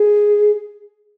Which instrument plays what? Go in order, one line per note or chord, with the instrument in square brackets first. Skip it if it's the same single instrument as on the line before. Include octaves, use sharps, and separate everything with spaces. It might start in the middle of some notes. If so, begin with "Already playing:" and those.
Already playing: [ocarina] G#4